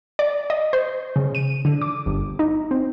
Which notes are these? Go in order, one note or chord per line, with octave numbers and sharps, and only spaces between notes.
D5
D#5
C5
C#3
D#7
D3
D6
G1
D#4
C4